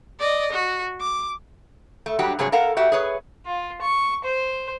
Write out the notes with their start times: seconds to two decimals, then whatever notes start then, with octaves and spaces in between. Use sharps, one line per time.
0.20 D5 D#5
0.52 F#4
1.00 D6
2.06 A3
2.19 F#3 G3 D4 F#4 G4
2.39 G2 C3 F#3 G#3 G#4 C#5
2.52 A4 A#4 F5 F#5
2.77 F#4 G4 E5
2.92 G#4 B4 C#5
3.46 F4
3.81 C#6
4.24 C5